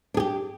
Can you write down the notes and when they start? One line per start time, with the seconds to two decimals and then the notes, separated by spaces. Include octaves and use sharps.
0.14 D4
0.17 G#4
0.20 G4